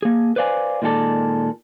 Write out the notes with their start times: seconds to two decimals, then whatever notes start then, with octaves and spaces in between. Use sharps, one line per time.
0.02 A#3 G#4
0.36 B4 C5 D5 F5 G#5
0.82 A#2 D#3 G#3 A3 A4 D5